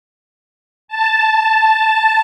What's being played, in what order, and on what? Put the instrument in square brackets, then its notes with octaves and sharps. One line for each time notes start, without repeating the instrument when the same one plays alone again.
[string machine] A5